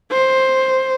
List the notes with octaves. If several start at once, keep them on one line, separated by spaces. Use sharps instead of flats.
C5